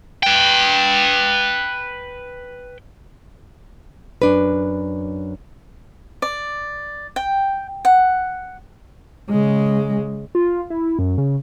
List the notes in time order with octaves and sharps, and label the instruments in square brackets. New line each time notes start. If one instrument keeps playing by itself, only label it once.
[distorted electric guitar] B4 G5
[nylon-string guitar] F#2 D4 B4
[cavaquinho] D5
G5
F#5
[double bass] C#3 G#3
[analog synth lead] F4
E4
F#2
C#3